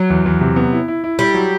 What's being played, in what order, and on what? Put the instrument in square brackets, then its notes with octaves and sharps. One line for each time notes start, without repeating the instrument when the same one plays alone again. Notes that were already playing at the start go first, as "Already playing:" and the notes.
Already playing: [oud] F#3
[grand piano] E2
E2
C3
B3
E4
E4
E4
[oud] G3 [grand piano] E4
[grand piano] F#3